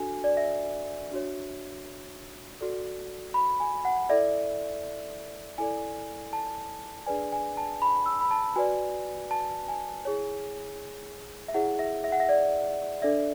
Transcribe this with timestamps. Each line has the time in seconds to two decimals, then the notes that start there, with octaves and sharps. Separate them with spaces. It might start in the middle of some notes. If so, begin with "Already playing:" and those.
Already playing: D4 F#4 A4 G#5
0.24 D5
0.37 E5
1.11 D4 F#4 C#5
2.61 F#4 A4 D5
3.34 B5
3.60 G#5
3.85 F#5
4.09 E4 A4 D5 E5
5.58 E4 A4 D5 G#5
6.33 A5
7.07 D4 G#4 B4 D5 G#5
7.32 G#5
7.57 A5
7.82 B5
8.06 E6
8.21 B5
8.31 A5
8.56 F#4 B4 D5 G#5
9.31 A5
9.68 G#5
10.05 E4 G#4 C#5
11.48 E5
11.54 E4 G#4 C#5 F#5
11.79 E5
12.04 E5
12.12 F#5
12.20 E5
12.29 D5
13.02 D4 A4 D5 E5